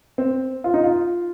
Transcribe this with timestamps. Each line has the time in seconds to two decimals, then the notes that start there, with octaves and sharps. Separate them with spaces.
0.18 C4
0.64 F4
0.74 D#4
0.84 F4